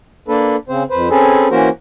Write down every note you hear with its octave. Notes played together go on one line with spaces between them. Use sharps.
A#3 D4 A4 B4
C#3 C4 C5
F2 B4 C5
C4 C#4 G#4 A4 B4
E3 A#3 C#4 F#4 A#4 C5